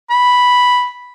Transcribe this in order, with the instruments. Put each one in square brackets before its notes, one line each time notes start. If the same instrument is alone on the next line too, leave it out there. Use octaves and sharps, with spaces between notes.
[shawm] B5